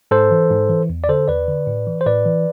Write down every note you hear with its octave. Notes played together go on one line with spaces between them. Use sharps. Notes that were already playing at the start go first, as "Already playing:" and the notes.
G#2 A4 C5
E3
G#2
E3
E2
D5
D3 A4 C5
E2 B4 D5
D3
A2
E3
C5
A2 B4 D5
E3